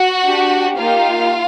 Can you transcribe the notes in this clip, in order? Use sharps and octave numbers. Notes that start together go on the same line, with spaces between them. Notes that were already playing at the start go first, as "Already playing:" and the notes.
Already playing: F#4 F#5
D4 G4
A#3 D#4 F4 G4 F5